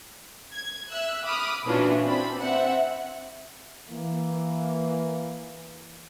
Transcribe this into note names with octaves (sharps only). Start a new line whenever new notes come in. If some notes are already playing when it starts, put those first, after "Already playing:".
G#6
E5 E6 F#6
B5 D6 D#6 F6
A#2 E3 C#4 D4 F4 F#4
C4 D4 B5
C4 E5 F#5
E3 A#3